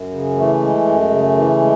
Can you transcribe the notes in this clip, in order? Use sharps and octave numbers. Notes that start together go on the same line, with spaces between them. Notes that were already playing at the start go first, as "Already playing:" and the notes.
Already playing: F#2
C#3
E3 A3
G#3
F#2
C#3
E3
G#3